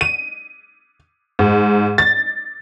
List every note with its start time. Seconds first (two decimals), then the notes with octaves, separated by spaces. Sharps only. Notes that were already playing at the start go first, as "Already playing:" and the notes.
0.01 D#7
1.39 G#2
1.98 A6